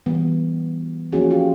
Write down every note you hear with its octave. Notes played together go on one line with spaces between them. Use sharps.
E3 G3 B3
F3 A#3 C#4 F#4 G#4
F4 G4